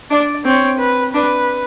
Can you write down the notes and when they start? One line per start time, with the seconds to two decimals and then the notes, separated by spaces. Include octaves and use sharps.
0.11 D4 D5
0.45 C4 C#5
0.79 B4
1.13 D4 B4